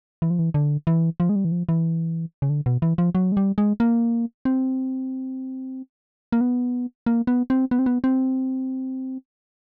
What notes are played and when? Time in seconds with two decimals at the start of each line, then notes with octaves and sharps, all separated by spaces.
0.22 E3
0.30 F3
0.39 E3
0.54 D3
0.87 E3
1.20 F3
1.29 G#3
1.36 G3
1.45 E3
1.52 F3
1.69 E3
2.42 C#3
2.50 D3
2.66 B2
2.82 E3
2.98 F3
3.15 F#3
3.32 G#3
3.37 G3
3.58 G#3
3.80 A#3
4.45 C4
6.32 A#3
6.41 B3
7.06 A#3
7.27 B3
7.50 C4
7.71 B3
7.79 C4
7.86 B3
8.04 C4